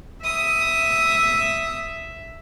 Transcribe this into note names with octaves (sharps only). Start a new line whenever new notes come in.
E5 D#6